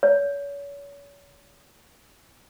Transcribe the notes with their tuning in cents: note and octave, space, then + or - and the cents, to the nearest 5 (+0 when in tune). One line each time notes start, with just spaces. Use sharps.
C#5 +35